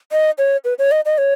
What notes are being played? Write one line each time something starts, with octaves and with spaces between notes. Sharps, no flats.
D#5
C#5
B4
C#5
D#5
D#5
C#5